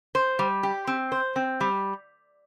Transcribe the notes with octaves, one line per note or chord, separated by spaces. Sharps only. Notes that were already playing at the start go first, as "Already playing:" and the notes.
C5
G3
G4
C4
C5
C4
G3